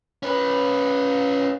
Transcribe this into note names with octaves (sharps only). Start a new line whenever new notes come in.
C#4 B4